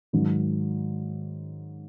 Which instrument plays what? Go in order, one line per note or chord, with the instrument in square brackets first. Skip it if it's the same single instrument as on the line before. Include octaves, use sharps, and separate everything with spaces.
[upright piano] G#2 D#3 F#3